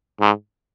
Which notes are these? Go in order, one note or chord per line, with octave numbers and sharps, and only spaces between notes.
G#2